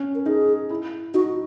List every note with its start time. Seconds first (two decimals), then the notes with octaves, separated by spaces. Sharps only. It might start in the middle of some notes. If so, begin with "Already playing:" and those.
Already playing: C#4
0.15 A#4
0.26 D#4 G#4
0.70 E4
1.14 D#4 F#4